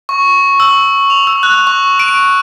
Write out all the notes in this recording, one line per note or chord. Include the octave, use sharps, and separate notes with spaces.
C#6
E6
F7
E6
F#6
C#6
D7